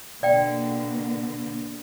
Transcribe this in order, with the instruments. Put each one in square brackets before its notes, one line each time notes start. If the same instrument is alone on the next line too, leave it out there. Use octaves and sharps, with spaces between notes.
[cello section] B2 D3 A#3 [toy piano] D5 G5